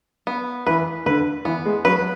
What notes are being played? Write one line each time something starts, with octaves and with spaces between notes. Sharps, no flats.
B3
E3 B4
D3 B4
E3 B3
G#3
F#3 B4